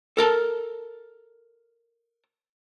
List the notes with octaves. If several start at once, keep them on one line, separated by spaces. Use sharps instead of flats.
A4 A#4 A5